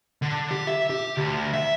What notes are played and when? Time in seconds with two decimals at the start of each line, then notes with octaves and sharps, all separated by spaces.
0.22 D3
0.51 G4
0.67 E5
0.90 G4
1.17 D2
1.53 E5